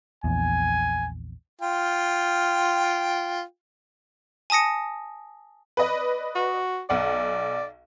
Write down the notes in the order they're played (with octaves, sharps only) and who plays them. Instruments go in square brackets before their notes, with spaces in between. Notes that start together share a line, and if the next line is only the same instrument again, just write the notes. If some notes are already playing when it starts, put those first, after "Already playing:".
[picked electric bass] A#1 E2 [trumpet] G#5
[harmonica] F4 G5
[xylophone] G#5 A5 D#6 A#6 C#7
[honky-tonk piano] B4 D5 D#5
[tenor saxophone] F#4
[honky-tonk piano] B1 F#5 [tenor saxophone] D5